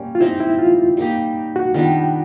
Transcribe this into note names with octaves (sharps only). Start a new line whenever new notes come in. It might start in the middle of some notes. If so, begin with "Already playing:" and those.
Already playing: G3 A#3 C#4
F4
C4 D#4 E4 G4 C5
E4
F4
G3 A#3 D#4 G4
F#4
D#3 G3 B3 D4 F4